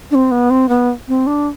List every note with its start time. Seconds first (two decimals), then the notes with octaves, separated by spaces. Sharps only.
0.11 D4
0.15 C4
0.31 B3
0.50 C4
0.69 B3
1.08 C4
1.27 D4